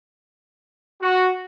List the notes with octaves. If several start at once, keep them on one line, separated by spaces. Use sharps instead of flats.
F#4